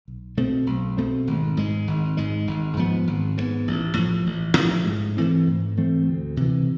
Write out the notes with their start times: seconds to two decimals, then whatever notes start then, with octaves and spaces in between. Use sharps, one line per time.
0.08 B1
0.37 B2 A3 C4
0.67 B1
0.97 B2 A3 C4
1.27 G#1
1.57 G#2 G#3
1.87 G#1
2.17 G#2 G#3
2.47 G#1
2.77 G#2 F3 B3
3.07 G#1
3.37 G#2 F3 B3
3.67 A1
3.97 A2 F3
4.26 A1
4.57 A2 F3
4.87 G#2
5.17 E3 A3 C4
5.47 G#2
5.77 E3 A3 C4
6.07 D2
6.37 C3 E3